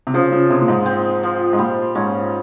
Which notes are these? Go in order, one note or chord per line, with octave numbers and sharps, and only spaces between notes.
C3
C#3 F3
C#3
C3 G#3
A#2
G#2
C4
F3
G#2
A#2 G3
G#2 C#4